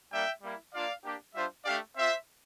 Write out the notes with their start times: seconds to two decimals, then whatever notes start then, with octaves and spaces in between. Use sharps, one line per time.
0.12 G3 A#3 D4 E5 G5
0.42 G3 A#3 E4
0.74 A#3 D4 F4 D5 F5
1.04 A#3 D4 G4
1.34 G3 D4 F4 C5 E5
1.65 A3 D4 G4 D5 F5
1.96 C4 F4 C5 E5